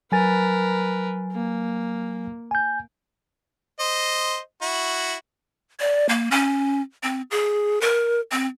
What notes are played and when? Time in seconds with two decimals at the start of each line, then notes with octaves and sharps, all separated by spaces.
0.12 F#3 A#4 B4 G#5 A6
1.32 A#3
2.51 G#5 G6
3.80 C5 D#5
4.62 E4 F#4
5.80 D5
6.09 A#3
6.31 C#4
7.03 C4
7.31 G#4
7.81 A#4
8.32 C4